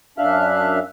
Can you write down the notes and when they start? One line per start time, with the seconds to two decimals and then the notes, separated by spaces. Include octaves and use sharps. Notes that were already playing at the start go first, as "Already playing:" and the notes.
0.18 F#2 D4 E5 F5 F6 F#6